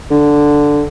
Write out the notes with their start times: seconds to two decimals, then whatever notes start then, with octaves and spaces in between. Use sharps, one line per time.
0.11 D3